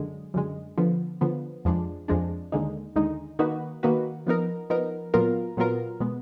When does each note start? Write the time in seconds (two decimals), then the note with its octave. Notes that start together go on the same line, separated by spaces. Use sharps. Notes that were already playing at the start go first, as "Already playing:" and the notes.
Already playing: F#2 D3 G#3
0.34 F#2 D3 G#3
0.77 D3 F3 B3
1.21 D3 F3 B3
1.65 F2 F3 G#3 D4
2.08 F2 F3 G#3 D4
2.52 D#2 D3 G#3 D#4
2.95 D#2 D3 G#3 D#4
3.39 D#3 A#3 D#4 F#4 B4
3.83 D#3 A#3 D#4 F#4 B4
4.27 F3 B3 D#4 A#4
4.70 F3 B3 D#4 A#4
5.14 A#2 F#3 B3 F4 A#4
5.57 A#2 F#3 B3 F4 A#4
6.00 B2 G#3 B3